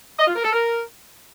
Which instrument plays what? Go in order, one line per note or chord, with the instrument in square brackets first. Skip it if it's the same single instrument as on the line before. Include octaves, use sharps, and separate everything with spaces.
[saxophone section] D#5
F4
A#4
A4
A#4